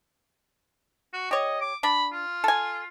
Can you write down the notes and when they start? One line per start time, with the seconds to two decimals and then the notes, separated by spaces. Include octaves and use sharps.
1.13 F#4
1.31 G4 C#5 D#5
1.61 D6
1.83 D4 B5
2.12 F4
2.44 A4 G#5